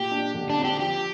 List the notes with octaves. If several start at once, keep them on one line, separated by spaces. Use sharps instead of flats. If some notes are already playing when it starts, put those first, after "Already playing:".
Already playing: A#2 G4
D4
D3
D4
C4
G4
F3 G4